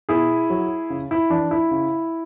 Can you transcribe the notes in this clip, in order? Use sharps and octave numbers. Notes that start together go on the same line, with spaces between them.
B2 E4 G#4
F#3
C#3
E4
E3 D4
E4
C#3